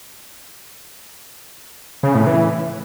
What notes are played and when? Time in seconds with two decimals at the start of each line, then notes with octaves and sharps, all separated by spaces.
2.03 C#3
2.15 A2
2.27 E3